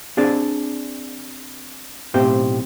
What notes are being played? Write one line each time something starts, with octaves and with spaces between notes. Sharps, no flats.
C4 D4 G#4 D5
B1 A2 C4 G4 C5